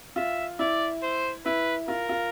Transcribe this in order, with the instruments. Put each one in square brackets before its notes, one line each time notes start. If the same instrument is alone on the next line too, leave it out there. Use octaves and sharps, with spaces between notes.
[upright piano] F4 [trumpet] E5
[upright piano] E4 [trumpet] D5
[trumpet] C5
[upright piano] E4 [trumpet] B4
[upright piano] F4 [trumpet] A#4
[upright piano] F4